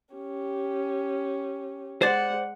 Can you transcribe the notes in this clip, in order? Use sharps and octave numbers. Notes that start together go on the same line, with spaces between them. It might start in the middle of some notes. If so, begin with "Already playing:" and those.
C#4 G4
G#3 C5 D5 F#5